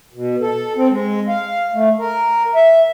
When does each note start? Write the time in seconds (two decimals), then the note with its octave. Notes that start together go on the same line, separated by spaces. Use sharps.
0.14 B2
0.41 A4
0.76 C4
0.90 G#3
1.29 F5
1.73 A3
1.99 A#4
2.55 E5